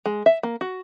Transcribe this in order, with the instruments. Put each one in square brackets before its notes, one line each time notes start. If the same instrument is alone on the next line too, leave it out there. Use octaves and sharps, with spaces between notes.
[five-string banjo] G#3
E5
A#3
F#4